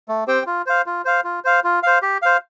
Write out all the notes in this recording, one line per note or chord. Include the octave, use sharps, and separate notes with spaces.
A3
C4 G4 C5 G5
F4
C5 F5
F4
C5 F5
F4
C5 F5
F4
C5 F5
G4
C5 F5